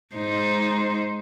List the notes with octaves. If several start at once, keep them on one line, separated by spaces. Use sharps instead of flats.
G#2 D#4 C5